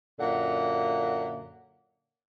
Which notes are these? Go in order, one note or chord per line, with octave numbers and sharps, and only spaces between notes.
F#2 A#2 D3 A#3 F#5